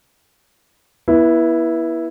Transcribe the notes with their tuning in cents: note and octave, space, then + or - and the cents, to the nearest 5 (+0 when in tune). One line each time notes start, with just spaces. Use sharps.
B3 -30 E4 +0